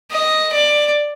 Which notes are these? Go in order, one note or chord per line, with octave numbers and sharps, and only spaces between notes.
D#5
D5